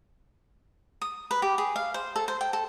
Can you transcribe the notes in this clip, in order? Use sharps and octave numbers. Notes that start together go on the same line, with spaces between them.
D#6
B4
G4
G#4
F5
C5
A4
C5
G5
A4